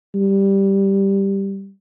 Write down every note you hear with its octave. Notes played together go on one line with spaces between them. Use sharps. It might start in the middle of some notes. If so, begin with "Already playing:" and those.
G3